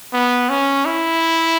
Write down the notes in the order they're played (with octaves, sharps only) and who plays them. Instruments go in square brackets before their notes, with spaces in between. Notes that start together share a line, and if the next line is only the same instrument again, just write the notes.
[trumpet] B3
C#4
E4